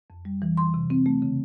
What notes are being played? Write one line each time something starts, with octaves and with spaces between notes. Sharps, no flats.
F2
G3
E3
E3 C6
C3
C4
A3
C#3